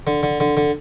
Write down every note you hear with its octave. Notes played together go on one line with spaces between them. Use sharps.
D3
D3
D3
D3